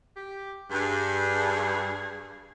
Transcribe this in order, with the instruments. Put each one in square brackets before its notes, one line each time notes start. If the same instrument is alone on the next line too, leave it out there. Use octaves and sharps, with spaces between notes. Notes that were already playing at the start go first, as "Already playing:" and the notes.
[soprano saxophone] G4
[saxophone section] G2 [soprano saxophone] G#4